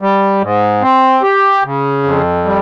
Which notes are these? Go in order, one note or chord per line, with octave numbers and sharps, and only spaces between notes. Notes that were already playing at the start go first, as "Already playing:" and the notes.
G3
G#2
C4
G4
C#3
F2
G3